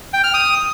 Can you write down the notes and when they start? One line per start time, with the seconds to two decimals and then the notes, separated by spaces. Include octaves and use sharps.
0.13 G5
0.24 F6
0.34 D#6